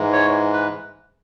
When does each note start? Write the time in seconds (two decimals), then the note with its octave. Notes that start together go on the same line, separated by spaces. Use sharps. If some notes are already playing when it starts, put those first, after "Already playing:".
Already playing: G#2 E3 G#3
0.13 C#5
0.53 B4